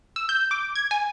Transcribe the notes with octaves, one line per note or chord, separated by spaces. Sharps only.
E6
G6
D6
G#6
G#5